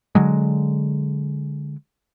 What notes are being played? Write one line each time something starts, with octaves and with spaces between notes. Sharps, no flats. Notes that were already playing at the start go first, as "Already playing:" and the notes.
D3 F#3 G#3